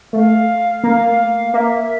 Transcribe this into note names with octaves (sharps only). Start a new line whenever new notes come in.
A3 F5
A#3
A#3 E5